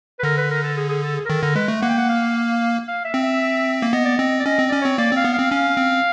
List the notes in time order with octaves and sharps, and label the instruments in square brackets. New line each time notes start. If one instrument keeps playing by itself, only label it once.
[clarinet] B4
[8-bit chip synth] D3 [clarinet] A#4
[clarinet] B4
A#4
A4
G#4
G#4
A4
G#4
A#4
[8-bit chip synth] D#3 [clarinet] A4
[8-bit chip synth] D3 [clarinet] A#4
[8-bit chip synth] G#3 [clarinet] B4
[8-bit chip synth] A3
[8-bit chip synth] A#3 [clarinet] F#5
[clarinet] G5
F#5
F5
F5
E5
[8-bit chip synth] C4
[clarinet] E5
[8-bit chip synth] A#3
[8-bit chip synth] B3 [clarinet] D#5
[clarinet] D5
[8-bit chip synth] C4 [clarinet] D#5
[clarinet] D5
[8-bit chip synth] C#4 [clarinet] D#5
[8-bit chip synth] C4
[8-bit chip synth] C#4 [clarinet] D5
[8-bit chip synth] C4 [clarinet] C#5
[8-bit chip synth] A#3 [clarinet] D5
[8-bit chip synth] C4 [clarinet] F5
[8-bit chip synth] B3
[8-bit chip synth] C4 [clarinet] F5
[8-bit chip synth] C#4 [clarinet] F5
[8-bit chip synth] C4